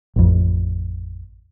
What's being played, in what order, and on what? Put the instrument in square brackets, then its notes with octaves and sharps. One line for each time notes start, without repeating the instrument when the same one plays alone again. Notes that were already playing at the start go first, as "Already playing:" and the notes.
[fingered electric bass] A1 F2